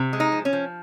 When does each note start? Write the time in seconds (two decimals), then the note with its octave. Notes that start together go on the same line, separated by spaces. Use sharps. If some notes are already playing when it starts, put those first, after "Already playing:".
Already playing: C3
0.13 G#3
0.20 D#4
0.32 F3
0.45 C#4
0.53 F3